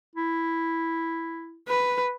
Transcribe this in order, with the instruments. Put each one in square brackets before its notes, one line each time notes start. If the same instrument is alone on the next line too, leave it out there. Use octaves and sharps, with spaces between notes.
[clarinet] E4
[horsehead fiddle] B4